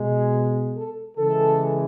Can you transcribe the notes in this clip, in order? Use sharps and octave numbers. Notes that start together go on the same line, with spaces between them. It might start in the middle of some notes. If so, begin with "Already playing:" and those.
Already playing: B2 G#3
G#4
A4
C#3 E3 G#3 A4